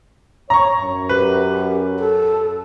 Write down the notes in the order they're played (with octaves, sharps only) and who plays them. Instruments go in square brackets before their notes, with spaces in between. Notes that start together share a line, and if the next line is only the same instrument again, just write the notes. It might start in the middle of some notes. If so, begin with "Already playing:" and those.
[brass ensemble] C#5 [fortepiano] A#5 C#6
[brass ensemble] F#2
[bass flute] G4 [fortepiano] B4
[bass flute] A4